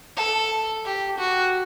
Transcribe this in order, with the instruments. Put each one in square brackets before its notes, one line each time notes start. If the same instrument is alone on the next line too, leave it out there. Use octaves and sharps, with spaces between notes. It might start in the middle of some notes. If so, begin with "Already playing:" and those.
[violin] A4
G4
F#4